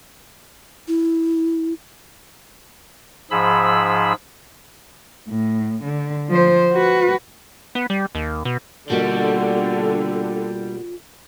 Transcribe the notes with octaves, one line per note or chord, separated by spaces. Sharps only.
E4
G#2 F3 G#4 B5 E6
A2
D3
F3 C5
F#4 B4
B3
G3
D#2
B2
B2 D3 G3 A#3 F4 F#4